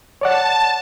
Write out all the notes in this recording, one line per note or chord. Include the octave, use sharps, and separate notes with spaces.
C#5 D5 F#5 A5